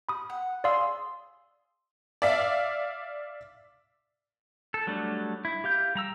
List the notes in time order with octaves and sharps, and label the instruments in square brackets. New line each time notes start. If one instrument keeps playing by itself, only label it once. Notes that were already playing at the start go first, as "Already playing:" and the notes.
[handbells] B5 D#6
[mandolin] F#5
[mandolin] G#4 C6 E6 [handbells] D5 F5
[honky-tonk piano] D5 E5 F5
[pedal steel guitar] A4
F#3 G3 A3 D4
E4
G4 F5 G6
G3 A#5 E6